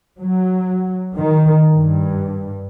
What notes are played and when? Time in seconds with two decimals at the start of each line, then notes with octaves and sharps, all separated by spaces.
0.20 F#3
1.17 D#3
1.72 G2